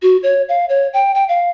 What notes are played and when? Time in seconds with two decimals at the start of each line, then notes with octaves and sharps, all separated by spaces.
0.02 F#4
0.23 C#5
0.49 F5
0.69 C#5
0.94 G5
1.15 G5
1.29 F5